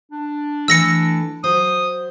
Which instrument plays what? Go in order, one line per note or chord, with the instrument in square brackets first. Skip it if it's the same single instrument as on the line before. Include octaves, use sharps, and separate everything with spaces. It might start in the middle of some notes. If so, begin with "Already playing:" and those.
[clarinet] D4
[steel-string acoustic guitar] E3 A3 [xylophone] E6 A#6 C#7
[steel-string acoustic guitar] F#3 C5 [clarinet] D#6